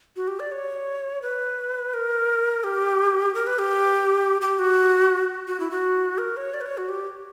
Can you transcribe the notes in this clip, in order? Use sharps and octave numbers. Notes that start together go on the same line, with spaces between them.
F#4
G4
D5
C#5
B4
A#4
G4
A#4
B4
G4
G4
F#4
F#4
E4
F#4
A#4
C#5
D5
B4
C#5
F#4
G4